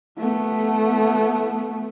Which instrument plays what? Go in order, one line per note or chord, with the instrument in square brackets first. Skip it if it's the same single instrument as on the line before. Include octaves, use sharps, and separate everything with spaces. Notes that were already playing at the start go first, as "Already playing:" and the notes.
[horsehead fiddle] A3 B3